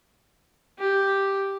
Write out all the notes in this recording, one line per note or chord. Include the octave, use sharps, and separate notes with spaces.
G4